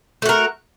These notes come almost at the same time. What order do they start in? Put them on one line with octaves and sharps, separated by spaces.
A3 F#4 A#4